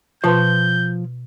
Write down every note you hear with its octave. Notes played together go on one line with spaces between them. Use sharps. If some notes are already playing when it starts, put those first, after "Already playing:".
B2 F3 F4 B4 A5 C6 G6